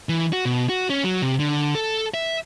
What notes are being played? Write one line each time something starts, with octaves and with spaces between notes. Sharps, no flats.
E3
F#4
B2
F#4
C#4
F#3
C3
D3
A4
E5